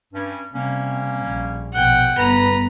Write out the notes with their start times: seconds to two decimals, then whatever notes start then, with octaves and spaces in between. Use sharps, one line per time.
0.14 G2 C#4
0.54 C3 G3 A#3 C#4
1.26 A#1
1.74 A#1 B2 F#5 G5
2.17 G1 B3 B4 A#5 B5